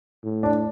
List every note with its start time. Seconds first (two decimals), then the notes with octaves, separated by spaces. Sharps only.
0.24 A2
0.43 D4